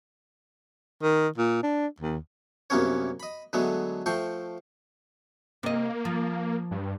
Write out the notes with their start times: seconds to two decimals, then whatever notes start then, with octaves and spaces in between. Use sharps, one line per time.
1.02 D#3
1.38 A#2
1.63 D4
2.00 D#2
2.70 C2 F#2 A#3 B3 C#4 C#5
3.20 D#5 B5
3.53 D3 F#3 G#3 A3 B3
4.06 F3 A3 G5 C6 C#6
5.63 C3 A#3 D#5
6.05 F3
6.71 G2